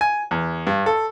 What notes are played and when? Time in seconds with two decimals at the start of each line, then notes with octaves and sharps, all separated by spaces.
0.01 G#5
0.31 E2
0.67 G2
0.86 A4